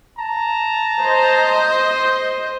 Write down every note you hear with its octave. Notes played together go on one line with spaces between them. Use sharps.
A5 A#5
C5 D#5